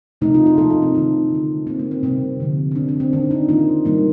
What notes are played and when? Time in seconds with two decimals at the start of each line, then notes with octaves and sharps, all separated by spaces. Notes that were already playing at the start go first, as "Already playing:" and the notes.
0.21 C3 F3 A3 D#4
0.34 F4
0.46 F4
0.58 C3 F3 A#3 A4
0.70 F4
0.82 C4
0.95 D#3 A3 D#4
1.30 D3 A3
1.67 D#3 A#3 C4
1.79 A#3
1.91 C4
2.03 C3 G3 A#3 C4
2.40 D3 F3 A#3
2.71 C4
2.75 D#3 A3 D4
2.88 C4
3.00 C4
3.12 D#3 A#3 D4
3.31 D#4
3.49 D#3 A#3 F4
3.85 D#3 G3 A#3